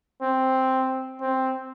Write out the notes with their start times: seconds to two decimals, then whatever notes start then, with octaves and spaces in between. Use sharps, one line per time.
0.22 C4
1.21 C4